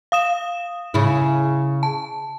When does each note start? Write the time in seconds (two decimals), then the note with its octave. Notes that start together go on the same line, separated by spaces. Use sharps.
0.12 F5 D#6 E7
0.94 C#3 E4
1.83 A5